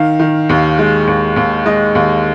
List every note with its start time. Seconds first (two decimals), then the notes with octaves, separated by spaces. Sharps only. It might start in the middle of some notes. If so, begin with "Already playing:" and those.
Already playing: D#3 F5
0.19 D#3
0.49 D#2
0.79 G#3
1.07 D#2
1.36 D#2
1.65 G#3 D#5
1.95 D#2